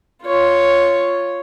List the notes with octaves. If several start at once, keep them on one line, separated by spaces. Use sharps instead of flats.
F4 C#5